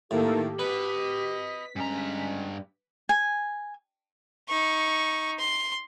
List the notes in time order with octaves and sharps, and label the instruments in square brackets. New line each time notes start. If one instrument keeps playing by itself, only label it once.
[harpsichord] A2 [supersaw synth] D#3 A#3 A4 [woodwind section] G4
[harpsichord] B4 [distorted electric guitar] D#5 B5 [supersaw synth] B6
[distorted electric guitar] G2 A#5 [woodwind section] G#3 C#4
[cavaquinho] G#5
[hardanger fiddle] D#4 C#6
C6